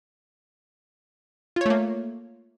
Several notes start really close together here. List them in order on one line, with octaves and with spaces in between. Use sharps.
F4 C#5 A3 A#3